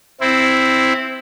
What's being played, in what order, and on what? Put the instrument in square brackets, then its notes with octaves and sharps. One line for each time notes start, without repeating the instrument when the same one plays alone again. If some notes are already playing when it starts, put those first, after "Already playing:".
[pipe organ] C4 E4